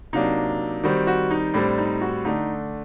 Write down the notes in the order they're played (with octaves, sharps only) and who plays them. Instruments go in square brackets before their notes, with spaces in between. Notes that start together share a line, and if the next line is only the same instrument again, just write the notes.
[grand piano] C3 F#3 A#3 D4 D#4
D#3 G3 C4 F#4
F#4
D#4
A2 G3 C4 D4
D#4
F#4
D3 A3 D4 D#4